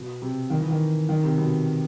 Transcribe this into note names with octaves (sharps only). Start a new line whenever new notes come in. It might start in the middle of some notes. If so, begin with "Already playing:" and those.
Already playing: B2
C3
D#3
E3
D#3
D#3
C3
B2